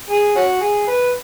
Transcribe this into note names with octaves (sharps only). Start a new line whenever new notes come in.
G#4
C#4 F#4
G#4
B4